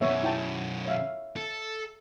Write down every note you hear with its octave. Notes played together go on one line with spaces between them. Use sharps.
F#2 B2 B3 C#5 E5
E4 G5 A5
C#5 E5 F5
A4